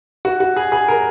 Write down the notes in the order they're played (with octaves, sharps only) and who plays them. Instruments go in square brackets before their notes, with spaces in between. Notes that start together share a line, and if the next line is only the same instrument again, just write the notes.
[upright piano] F#4
F#4
G#4
G#4
A#4